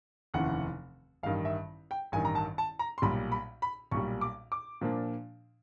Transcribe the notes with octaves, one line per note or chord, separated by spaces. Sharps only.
F1 D#2 C#3 E3 F#5
A1 G2 D#3 F5
E5
G5
A1 G2 D#3 G#5
A#5
A5
A5
A#5
C6
B1 A#2 G3 B5
B5
B5
B1 A#2 G3 C#6
D6
D6
A#2 F3 A#3 D4